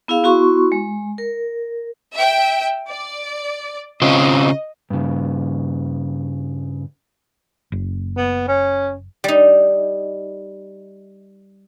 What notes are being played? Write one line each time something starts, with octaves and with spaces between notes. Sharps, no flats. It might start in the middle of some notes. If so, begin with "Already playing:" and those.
B3 E4 G#4 F5
B3 E4 F#4 C6 C#6
G#3
A#4
E5 G5
D5
C#3 C4 F4 D#5
G2 C#3
F#1
B3
C#4
G3 D#4